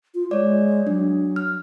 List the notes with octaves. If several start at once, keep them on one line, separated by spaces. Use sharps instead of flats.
F4
G#3 C#5 D5
F#3 D4
F6